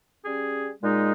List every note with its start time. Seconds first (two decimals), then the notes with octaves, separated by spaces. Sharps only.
0.24 G3 C#4 G#4
0.82 A#2 G#3 D#4 G#4